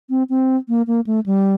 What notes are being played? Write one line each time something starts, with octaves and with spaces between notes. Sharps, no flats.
C4
C4
A#3
A#3
A3
G3